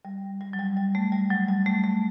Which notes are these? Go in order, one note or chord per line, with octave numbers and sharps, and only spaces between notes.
G3
G3
F#3
G3
G3
A3
G3
F#3
G3
A3
A3